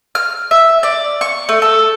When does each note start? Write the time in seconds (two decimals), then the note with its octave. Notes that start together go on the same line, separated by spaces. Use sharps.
0.15 F6
0.51 E5
0.83 D5
1.21 C#6
1.49 A3
1.62 A4